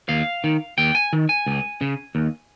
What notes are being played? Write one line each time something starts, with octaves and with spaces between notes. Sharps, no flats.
D#2 F5
D#3
D#2 G5
G#5
D#3
G#5
C#2
C#3
D#2